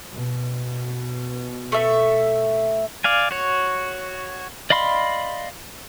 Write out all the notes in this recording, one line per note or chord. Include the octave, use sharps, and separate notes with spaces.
B2
A3 A4 E5
D5 F5 G#5
F#4 C#5
D5 D#5 F5 B5 C6